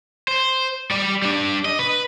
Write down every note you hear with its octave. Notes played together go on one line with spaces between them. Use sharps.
C5
G3 D5
G3 D4
D#5
B4